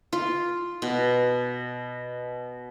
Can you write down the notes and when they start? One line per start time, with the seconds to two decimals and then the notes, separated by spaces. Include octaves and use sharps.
0.13 F4
0.82 B2